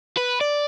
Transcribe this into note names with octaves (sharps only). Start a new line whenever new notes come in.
B4
D5